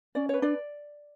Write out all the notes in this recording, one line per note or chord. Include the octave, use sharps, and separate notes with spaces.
C#4 D5
B4 C#5
D4 D5